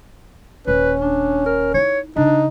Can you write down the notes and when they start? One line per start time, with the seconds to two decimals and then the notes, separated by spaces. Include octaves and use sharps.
0.67 D#1 C#4 B4
1.01 D4
1.46 A#4
1.74 D#4 E4 C#5
2.16 C#3 D4 D#4